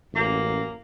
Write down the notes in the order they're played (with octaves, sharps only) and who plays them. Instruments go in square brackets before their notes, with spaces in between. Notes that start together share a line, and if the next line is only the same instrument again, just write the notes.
[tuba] A1 [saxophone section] F#2 A#3